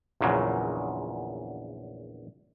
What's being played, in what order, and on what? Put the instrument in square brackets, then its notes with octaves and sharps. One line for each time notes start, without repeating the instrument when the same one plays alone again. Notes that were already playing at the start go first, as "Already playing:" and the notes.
[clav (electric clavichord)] A#1 E2 A#2 C#3 F#3